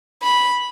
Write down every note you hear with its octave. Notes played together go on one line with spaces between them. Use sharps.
B5